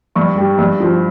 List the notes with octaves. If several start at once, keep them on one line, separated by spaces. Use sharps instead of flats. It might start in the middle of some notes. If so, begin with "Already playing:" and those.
G2 C#6
G3
G2
F3